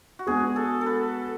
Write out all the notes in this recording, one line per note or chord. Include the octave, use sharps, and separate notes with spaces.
F#4
G#3 B3 D4 G#4
A4
A4
B4